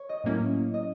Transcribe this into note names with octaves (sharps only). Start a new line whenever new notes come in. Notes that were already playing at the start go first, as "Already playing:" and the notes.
Already playing: C#5
D#5
A2 F#3 A#3 C#4 E4
D#5